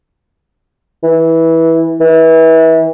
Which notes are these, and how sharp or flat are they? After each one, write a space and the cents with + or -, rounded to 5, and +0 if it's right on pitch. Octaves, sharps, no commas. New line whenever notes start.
E3 -15
E3 -30